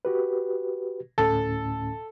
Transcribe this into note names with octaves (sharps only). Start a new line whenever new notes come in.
F#4 G4 B4
D2 A2 C#4 A4